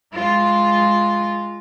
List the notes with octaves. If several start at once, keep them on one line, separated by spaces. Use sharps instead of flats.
G#3 F4